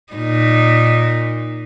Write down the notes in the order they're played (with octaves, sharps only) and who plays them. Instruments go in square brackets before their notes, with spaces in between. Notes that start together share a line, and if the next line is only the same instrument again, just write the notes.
[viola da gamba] A#2 D#4